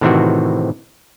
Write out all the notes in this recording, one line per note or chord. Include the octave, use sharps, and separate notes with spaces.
A2 C3 D#3 E3 C4 F#4